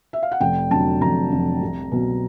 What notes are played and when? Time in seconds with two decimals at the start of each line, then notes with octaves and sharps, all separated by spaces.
0.13 E5
0.23 F5
0.32 F#5
0.41 F1 G5
0.71 F2 D3 F#3 A5
1.01 F1 A#5
1.31 F2 D3 F#3
1.62 C2
1.92 B2 F#3